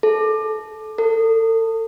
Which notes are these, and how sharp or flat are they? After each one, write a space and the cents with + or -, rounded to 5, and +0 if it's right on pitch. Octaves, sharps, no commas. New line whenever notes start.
A4 -25
A4 +40